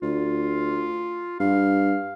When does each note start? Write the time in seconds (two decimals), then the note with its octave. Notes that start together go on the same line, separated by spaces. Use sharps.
0.02 D2 F4
1.40 G2 F5